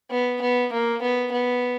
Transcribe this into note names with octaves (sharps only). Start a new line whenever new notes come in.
B3
B3
A#3
B3
B3